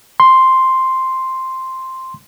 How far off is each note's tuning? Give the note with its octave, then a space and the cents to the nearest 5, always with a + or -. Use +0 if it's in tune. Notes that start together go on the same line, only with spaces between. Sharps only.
C6 +0